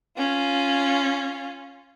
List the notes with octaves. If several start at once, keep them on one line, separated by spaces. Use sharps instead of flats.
C#4 F4